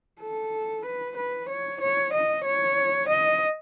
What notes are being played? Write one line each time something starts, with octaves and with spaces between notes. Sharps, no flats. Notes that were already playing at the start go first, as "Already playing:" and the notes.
A4
B4
B4
C#5
C#5
D#5
C#5
D#5